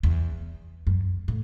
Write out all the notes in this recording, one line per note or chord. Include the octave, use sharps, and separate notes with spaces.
E2
F#2
A2